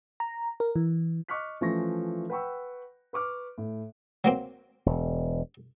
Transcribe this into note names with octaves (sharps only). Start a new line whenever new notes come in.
A#5
A#4
E3
D#5 C#6 D6 F6 F#6 B6
E3 F3 A3 C#4 C#6 A#6
B4 F#5 G5 B5 C#6 E6
B4 C#6 D6 F6
A2
F#3 A#3 C4
E1